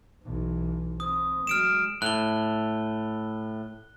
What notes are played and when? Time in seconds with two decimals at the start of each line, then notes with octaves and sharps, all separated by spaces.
0.24 B1 E3
1.00 C4 D#6
1.47 F#3 G#3 F6 D7 E7
2.02 A2 F#6 G7